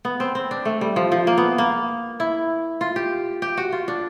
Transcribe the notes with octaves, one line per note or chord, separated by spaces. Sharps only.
B3
C4
C4
D4
A3
G3
F3
F3
A#3
B3
A#3
E4
F4
G4
G4
F#4
F4
D4